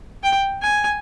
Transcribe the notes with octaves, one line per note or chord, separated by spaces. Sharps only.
G5
G#5